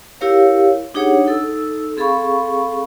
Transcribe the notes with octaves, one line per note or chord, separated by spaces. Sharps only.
E4 G4 A#4 C#5 F5
D4 D#4 G4 G#4 C#5 F#5
D#4 A4 E6
C4 G#4 A4 F5 B5 C#6